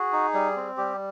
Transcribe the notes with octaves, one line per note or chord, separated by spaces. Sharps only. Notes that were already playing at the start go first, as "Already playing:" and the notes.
Already playing: F#4 G#4
D#4
G3
C4
G3 G4